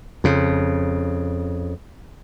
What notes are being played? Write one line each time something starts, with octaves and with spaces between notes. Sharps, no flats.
F2 C#3